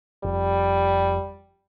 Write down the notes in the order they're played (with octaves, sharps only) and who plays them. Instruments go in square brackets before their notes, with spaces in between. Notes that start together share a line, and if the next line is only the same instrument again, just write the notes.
[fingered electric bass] F1 [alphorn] G3